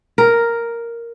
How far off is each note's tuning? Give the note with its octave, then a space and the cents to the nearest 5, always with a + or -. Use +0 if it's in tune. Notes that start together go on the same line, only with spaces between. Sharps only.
A#4 +0